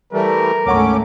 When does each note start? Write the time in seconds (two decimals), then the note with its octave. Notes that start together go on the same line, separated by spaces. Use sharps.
0.13 E3 G3 A3 A#4
0.66 G#1 D2 A3 C#4 F#5 C#6 D6